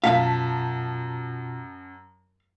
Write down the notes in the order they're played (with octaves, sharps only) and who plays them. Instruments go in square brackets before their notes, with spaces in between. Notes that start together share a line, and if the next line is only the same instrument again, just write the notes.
[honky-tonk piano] F#2 A5 B6 [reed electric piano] B2 F4 [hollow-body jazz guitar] F5